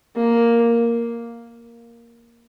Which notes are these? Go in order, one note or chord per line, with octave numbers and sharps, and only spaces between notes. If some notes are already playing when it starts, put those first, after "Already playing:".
A#3